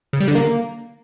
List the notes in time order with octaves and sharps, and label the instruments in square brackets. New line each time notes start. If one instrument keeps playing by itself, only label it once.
[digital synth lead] C#3
G3
D3
A#3